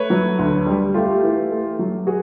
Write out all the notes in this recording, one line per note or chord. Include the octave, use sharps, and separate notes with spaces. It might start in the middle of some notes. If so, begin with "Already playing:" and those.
Already playing: A3 B4 C#5
F#3
D2
G3
A3 F4 G4
E3
A3
F#3
F#4 G#4